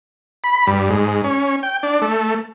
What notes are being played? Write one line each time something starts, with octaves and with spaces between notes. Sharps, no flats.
B5
G2
G#2
C#4
G5
D4
A3